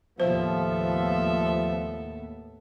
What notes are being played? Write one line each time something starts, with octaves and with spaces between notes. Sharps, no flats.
D#2 A2 F3 B3 A4 C5 E5